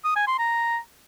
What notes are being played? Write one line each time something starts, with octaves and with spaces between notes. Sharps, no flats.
D#6
G#5
C6
A#5